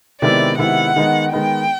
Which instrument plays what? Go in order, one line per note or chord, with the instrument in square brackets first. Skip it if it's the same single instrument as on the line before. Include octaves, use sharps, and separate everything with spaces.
[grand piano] C3 D#3 G#3 B3 E4 [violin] D5
[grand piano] C3 D#3 G#3 B3 E4 [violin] F#5
[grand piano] D#3 G#3 B3 D#4
[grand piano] D#3 G#3 B3 D#4 [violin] G5